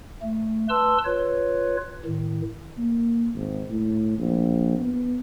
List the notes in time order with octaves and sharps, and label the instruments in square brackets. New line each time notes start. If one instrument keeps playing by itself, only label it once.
[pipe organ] A3
B4 A5 C6 E6
F4 B4 C#5
A2 D#3
[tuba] A#3
G#1
A2
A#1
B3